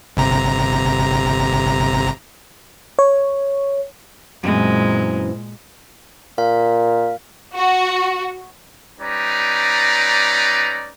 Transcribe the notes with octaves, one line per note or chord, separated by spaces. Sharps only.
G1 C3 A#5
C#5
F#2 A#2 E3 G#3 C4
A#2 F5
F#4
G3 C#4 D#4 B4 D5 A#5